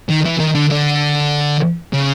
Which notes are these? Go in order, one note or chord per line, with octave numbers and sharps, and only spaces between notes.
D#3
E3
D#3
D3
D3
C#3